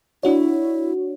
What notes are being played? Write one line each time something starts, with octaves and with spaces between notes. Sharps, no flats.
D4 E4 F#4 C#5